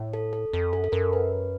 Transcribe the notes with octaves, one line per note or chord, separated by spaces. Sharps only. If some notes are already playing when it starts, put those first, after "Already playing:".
Already playing: A2
A4
A4
F2 A4
F#2 A4
A4
F#2 A#4
B4